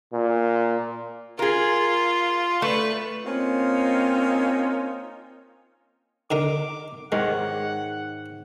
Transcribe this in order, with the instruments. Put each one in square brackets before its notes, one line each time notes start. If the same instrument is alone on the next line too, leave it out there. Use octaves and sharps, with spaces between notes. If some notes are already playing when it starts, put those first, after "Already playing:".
[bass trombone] A#2
[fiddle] F4 [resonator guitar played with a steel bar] G#4 A#4
[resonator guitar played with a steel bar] A3 [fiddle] B4
[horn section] A#3 C4 C#4 D#4 F4
[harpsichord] D3 D#4 A#4 [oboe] D6
[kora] G#2 D#3 C#5 [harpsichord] G#3 [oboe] F#5